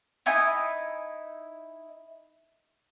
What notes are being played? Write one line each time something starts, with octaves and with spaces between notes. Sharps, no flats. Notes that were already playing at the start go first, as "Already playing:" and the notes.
D#4 E4 G#5 D#6